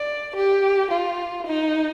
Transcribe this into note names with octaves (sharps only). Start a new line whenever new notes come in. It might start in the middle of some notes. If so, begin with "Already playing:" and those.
Already playing: D5
G4
F4
D#4